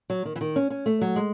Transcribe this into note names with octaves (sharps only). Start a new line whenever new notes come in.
F#3
D#3
E3
D#3
C#4
C#4
A3
F#3
G#3